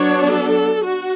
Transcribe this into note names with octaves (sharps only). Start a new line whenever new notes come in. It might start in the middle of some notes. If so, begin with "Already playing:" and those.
Already playing: F#3 B3 D4 C#5
A4
F#4